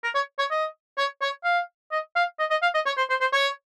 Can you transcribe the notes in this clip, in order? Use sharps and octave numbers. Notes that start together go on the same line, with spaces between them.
A#4
C#5
C#5
D#5
C#5
C#5
F5
D#5
F5
D#5
D#5
F5
D#5
C#5
C5
C5
C5
C#5